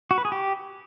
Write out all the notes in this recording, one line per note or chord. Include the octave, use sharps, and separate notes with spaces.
F#4
B4
G#4
G4